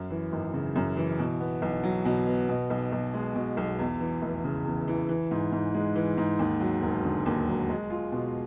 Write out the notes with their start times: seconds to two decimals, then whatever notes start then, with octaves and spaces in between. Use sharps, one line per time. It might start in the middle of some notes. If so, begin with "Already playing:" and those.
Already playing: F#2
0.10 E3
0.32 G#1
0.54 C#3
0.76 F#2
0.97 E3
1.19 B2
1.40 B3
1.62 B1
1.83 F#3
2.05 B2
2.27 B3
2.49 B2
2.70 B1
2.92 B1
3.14 G#3
3.35 B2
3.57 B1
3.79 E2
4.00 E3
4.22 F1
4.44 C#3
4.66 E2
4.88 E3
5.09 E3
5.31 G#2
5.52 G#2
5.74 G#3
5.96 E3
6.18 G#2
6.39 D#2
6.60 F#3
6.82 E1
7.04 D3
7.26 D#2
7.48 F#3
7.69 G#3
7.90 F4
8.12 B2